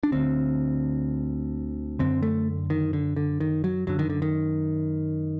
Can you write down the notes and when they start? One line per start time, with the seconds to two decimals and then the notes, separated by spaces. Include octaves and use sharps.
0.03 D4
0.12 D2 D3 C4
1.99 F#2 D3 C4
2.23 A3
2.70 D#3
2.93 D3
3.16 D3
3.40 D#3
3.64 F#3
3.87 F#2 D3 F#3
3.99 D#3
4.10 D3
4.22 D#3